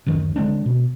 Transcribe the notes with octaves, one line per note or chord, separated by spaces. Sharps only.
D1 F#2 D#3
D3 G#3 C4 D4
B2